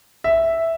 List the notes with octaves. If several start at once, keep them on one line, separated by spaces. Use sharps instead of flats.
E5